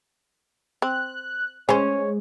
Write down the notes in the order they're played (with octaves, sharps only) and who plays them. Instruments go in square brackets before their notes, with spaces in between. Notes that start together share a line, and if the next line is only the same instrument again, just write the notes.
[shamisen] C4 [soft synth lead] F#6
[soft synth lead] G#3 [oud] C#4 [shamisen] G#4 C5 [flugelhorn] C#5